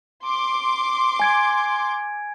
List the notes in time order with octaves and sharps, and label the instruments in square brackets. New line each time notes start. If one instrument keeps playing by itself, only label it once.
[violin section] C6 D6
[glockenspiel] G#5 G#6 D7